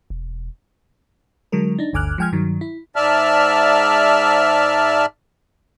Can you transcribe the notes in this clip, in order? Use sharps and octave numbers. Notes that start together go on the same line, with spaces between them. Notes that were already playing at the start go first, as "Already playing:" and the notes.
E1
D3 F#3 G#3 A#4
D4 D#4
G1 D2 G#5 D6 F6 F#6
F3 G#3 G5 G#5 F6 G#6
G2 D#3 F#3
E4
G#2 D5 E5 A5 F6